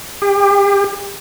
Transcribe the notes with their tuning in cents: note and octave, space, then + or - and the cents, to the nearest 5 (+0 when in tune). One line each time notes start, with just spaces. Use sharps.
G4 +35